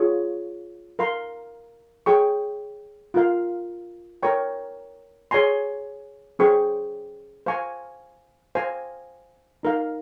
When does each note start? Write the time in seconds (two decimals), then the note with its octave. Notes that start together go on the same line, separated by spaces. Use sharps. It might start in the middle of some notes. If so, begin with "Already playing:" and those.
Already playing: F4 G#4 C#5
0.99 A#4 F5 C6
2.06 G#4 C#5 G5 C#6
3.14 F4 A#4 F5
4.23 A#4 C#5 G5 C#6
5.31 G#4 C#5 G#5 C6
6.39 C#4 G#4 C5 G5 C#6
7.46 C5 F5 G#5 C#6
8.55 C5 F5 G#5
9.63 D#4 A#4 F5